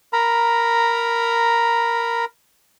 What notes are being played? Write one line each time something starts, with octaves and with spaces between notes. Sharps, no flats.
A#4 A#5 B5